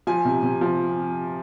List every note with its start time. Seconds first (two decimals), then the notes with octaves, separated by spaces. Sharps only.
0.07 F3 G#5
0.25 C3
0.43 C3
0.61 F3